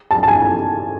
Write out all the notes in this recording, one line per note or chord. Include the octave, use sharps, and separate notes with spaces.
A5
A5
G#5